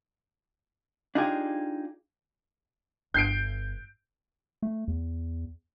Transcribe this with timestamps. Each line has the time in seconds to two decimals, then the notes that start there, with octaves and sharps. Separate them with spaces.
1.15 D4 D#4 F4 G4 G#4
3.14 G1 G6 C7 D7
4.62 A3
4.88 E2